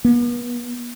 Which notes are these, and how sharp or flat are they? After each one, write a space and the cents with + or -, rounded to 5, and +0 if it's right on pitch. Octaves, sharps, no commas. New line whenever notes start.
B3 -40